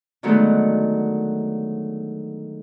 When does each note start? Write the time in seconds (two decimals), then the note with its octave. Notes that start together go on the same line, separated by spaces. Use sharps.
0.23 D3 D#3 F#3 G#3 A3 B3